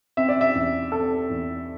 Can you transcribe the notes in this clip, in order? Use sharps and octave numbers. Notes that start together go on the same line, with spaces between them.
C4 E5
D5
E5
E2
C4 A4
E2